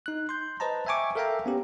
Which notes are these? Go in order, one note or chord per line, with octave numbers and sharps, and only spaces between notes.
D#4 F#6
C6 G6
B4 C5 D#5 A5 A#5
E5 G5 G#5 C#6 D6
A4 A#4 E5 F5 G5 A#5
B3 C#4 G4